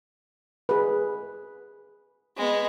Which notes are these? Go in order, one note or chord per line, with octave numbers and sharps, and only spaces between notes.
G#4 B4
G#3 B3